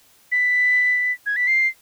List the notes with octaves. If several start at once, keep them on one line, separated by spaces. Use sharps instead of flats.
B6
G#6
B6
C7